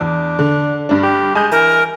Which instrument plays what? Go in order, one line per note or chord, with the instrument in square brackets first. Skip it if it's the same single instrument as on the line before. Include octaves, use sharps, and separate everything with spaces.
[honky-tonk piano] E2 [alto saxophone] D4
[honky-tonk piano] D3
G2 D4
[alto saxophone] G4
[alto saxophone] G#3 [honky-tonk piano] G#5 G6
[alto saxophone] E3 [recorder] A#4